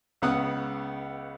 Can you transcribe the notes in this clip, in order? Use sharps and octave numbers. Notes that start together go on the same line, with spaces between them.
C#2 C#3 B3 F#5 D#6